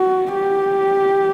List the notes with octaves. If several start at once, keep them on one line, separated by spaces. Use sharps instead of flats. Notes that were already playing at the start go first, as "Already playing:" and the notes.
Already playing: F#4
G4